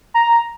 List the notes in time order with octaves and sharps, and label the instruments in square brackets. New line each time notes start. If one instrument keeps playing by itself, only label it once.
[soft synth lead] A#5